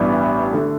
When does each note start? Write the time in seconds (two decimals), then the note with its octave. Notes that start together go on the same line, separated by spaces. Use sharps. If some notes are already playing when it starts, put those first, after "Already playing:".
Already playing: A1 G2 E3 B3 D4
0.52 D3 A3